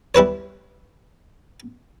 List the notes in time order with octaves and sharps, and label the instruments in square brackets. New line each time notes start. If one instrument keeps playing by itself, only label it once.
[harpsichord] G3 E4 B4 C#5